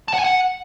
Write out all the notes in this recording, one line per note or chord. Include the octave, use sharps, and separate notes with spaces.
A5
F#5
G#5
F#5